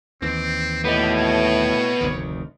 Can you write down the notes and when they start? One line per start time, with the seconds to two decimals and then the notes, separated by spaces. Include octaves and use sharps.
0.22 D#2 E3 C4
0.84 A2 B3 G4 D#5
1.15 C#5
2.01 F1 D2 D#3